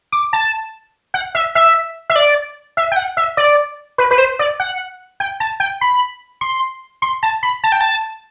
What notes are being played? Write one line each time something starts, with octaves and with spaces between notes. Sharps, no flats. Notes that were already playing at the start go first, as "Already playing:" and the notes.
D6
A5
F#5
E5
E5
E5
D5
E5
G5
F#5
E5
D5
B4
B4
C5
D5
F#5
G5
A5
G5
B5
C6
C6
A5
B5
A5
G5
A5